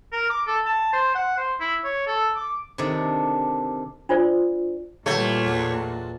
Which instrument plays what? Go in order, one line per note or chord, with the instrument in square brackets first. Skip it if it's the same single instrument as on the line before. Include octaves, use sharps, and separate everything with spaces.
[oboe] A#4
D6
A4
A5
C5
F#5
C5
E4
C#5
A4
D6
[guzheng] C3 D#3 D4 A4
[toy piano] D4 F4 C5 D5
[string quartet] A#2 [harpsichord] E3 F#3 G3 [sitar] A3 [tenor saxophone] C#5
[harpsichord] E2 F#3 D4